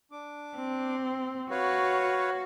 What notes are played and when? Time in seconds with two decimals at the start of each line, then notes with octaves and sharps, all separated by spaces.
0.11 D4 D6
0.57 C4
1.51 F#4 B4 C#5 F5